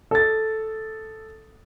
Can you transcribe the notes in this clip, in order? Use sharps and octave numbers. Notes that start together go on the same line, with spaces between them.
A4 A6